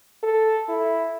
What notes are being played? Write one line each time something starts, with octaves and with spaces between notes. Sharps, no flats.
A4
E4